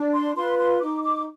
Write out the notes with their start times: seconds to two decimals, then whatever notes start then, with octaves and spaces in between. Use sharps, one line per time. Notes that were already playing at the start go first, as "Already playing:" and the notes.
Already playing: D4
0.14 C6
0.35 F4 B4 C6
0.59 C6
0.81 D#4 D6
1.02 D6